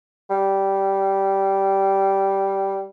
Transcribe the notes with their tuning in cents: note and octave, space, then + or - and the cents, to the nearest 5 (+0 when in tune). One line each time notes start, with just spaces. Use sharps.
G3 -10